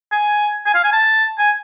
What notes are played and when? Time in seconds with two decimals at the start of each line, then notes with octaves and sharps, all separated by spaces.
0.12 G#5
0.66 G#5
0.75 F5
0.84 G#5
0.93 A5
1.38 G#5